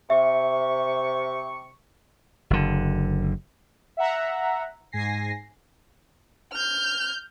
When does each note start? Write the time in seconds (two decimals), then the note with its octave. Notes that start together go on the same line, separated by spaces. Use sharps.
0.10 C3 E5 C#6
2.50 F#1 D3
3.97 E5 F#5 A#5
4.92 G#2 G#5 A#6 C7
6.53 F6 G6